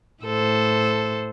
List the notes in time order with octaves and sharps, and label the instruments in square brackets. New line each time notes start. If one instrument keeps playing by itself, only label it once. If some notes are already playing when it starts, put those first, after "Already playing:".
[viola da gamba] A2 A4 C5